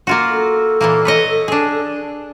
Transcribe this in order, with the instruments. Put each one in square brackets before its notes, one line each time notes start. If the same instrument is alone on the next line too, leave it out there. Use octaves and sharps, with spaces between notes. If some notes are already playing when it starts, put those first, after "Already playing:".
[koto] A#3 F4 F#4
[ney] A4
[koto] A#2 E3 A#3
B4 C#5 D#5
D4 G#4